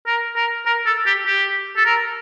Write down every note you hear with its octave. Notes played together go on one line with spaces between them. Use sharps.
A#4
A#4
A#4
A4
G4
G4
A4
A#4